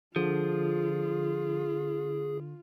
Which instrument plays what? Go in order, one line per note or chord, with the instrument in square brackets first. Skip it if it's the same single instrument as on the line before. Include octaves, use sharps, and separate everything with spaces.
[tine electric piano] D3 [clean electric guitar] F3 [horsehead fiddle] F4 [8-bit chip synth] G#4